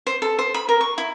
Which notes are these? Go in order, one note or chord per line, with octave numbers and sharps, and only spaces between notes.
C5
A4
C5
B5
A#4
C#6
E4